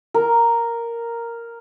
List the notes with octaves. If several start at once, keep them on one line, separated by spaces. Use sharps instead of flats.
A#4